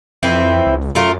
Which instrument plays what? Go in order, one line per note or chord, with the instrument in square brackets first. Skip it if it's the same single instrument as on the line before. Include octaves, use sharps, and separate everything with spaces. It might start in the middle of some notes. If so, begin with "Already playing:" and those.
[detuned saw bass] F2 [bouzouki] E3 C4 E4
[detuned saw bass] C#2
[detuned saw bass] F#2 [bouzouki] A3 F4 A#4